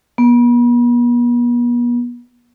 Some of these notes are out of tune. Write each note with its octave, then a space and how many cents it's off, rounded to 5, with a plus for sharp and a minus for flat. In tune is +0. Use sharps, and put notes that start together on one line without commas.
B3 -45